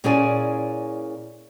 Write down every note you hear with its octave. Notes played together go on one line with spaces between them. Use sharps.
A#2 C#4 E4 G#4 D5 G#5